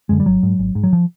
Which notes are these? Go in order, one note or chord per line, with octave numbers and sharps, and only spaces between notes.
F#2 D3 G#3
G3
G#1 F#3
G#2
G#1
G#2
F#3
F3